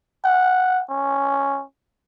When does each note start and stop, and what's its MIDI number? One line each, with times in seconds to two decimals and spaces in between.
0.25 0.83 78
0.90 1.63 61